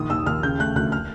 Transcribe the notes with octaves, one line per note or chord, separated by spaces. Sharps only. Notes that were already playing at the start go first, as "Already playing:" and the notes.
Already playing: A#1 D#3 D#6
D#2 E6
D#2 F6
C#3 G6
A3 F#6
D2 F#6
F6